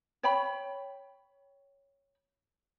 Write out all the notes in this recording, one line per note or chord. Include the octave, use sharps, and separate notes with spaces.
C#5 G5 B5